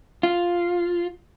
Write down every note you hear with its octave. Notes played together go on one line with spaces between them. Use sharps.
F4